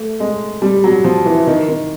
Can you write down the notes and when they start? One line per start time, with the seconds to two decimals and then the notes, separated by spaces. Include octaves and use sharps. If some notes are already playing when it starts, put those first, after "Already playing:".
Already playing: A3
0.20 G#3
0.62 G3
0.84 F#3
1.04 F3
1.25 E3
1.47 D#3
1.68 D#3